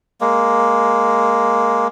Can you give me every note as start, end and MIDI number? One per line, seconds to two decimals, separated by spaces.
0.21 1.87 56
0.21 1.87 58